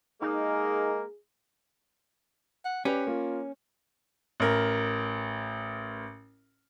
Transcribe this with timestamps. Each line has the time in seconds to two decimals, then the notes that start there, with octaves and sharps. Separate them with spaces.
0.22 G#3 A#3 D#4 G#4 A#4
2.65 F#5
2.85 C#4 G4 B4 D5
3.07 A#3 F4
4.40 A1 A#4